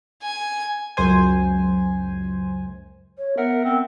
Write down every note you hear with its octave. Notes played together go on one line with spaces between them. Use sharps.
G#5
C#2 F#2 C5 G#5
C#5
B3 A#4 E5 F#5
C4